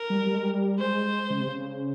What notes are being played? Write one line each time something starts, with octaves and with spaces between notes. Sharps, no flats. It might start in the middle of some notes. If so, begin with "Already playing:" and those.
Already playing: A#4
G3
G3
G#3
G3
G#3 C5
C#3
C3
C#3